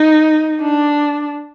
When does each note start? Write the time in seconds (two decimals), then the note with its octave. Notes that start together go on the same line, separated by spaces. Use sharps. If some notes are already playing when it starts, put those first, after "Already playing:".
Already playing: D#4
0.61 D4